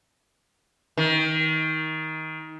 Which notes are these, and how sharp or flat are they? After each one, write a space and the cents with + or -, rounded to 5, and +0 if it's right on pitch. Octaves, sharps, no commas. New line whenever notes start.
D#3 +20